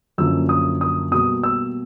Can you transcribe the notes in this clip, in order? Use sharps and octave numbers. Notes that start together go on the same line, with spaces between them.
F#2 D3 F3 A#3 E6
D#6
D#6
B2 G3 A#3 D#6
E6